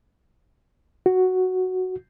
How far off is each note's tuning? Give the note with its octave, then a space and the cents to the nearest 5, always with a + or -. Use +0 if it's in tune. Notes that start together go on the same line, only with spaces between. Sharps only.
F#4 +0